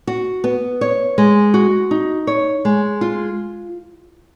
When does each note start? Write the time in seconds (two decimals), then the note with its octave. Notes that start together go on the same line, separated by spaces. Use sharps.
0.07 F#4
0.44 B3
0.81 C#5
1.18 G#3
1.54 F#4
1.91 D#4
2.27 C#5
2.65 G#3
3.01 F4